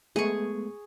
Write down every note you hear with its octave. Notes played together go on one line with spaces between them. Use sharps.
G#3 A3 B3 G#4 C#6